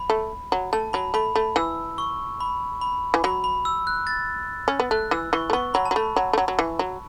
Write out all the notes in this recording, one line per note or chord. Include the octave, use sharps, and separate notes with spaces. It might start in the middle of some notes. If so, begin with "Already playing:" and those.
Already playing: B5
A3
F#3
A3 A5
F#3 B5
A3 B5
A3 B5
E3 E6
C#6
B5
B5
E3
F#3 B5
B5
E6
F#6
A6
C#4
B3
A3 F#6
E3 E6
E3 C#6
A3
B3 C#6
F#3 B5
A5
F#3
A3 B5
F#3
A3
F#3
F#3
E3
F#3